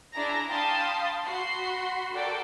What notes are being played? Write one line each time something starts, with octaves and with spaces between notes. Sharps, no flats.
D4 E4 G#4 A#5 A#6
F5 G5 A5 B5 C6 D#6
F#4 B5 C6 C7
F#4 A4 A#4 D5 G5